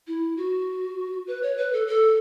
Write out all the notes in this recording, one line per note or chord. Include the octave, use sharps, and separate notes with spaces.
E4
F#4
B4
C#5
B4
A4
A4